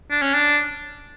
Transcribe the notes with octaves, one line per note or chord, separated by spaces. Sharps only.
D4
C#4
D4